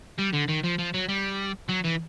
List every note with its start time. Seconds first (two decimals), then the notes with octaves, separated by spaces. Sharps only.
0.18 G3
0.33 D3
0.48 D#3
0.64 F3
0.78 F3
0.94 F#3
1.09 G3
1.69 F#3
1.85 E3